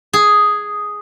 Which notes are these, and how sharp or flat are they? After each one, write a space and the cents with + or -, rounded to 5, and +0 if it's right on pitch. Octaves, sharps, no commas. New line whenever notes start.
G#4 +0